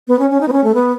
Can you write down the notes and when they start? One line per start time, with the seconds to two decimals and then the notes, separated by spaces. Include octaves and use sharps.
0.08 B3
0.19 C#4
0.30 C#4
0.41 D#4
0.48 B3
0.52 C#4
0.64 A3
0.74 B3